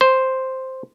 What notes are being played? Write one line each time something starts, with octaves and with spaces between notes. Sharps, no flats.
C5